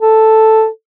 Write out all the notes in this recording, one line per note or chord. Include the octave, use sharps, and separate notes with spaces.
A4